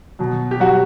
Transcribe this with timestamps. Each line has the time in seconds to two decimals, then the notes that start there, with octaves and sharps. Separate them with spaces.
0.19 B2 F#3
0.51 G4
0.60 B2 F#3 F#4